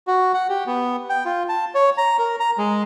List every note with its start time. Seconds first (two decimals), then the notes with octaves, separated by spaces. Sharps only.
0.07 F#4
0.34 F#5
0.49 G4
0.67 B3
1.10 G5
1.25 F4
1.49 A5
1.75 C#5
1.98 A#5
2.19 A#4
2.40 A#5
2.58 G#3